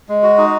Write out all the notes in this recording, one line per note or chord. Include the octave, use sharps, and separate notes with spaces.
G#3
F#4
D#4